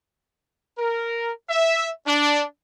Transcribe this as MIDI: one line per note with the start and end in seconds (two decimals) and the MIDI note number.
0.78 1.31 70
1.49 1.88 76
2.06 2.42 62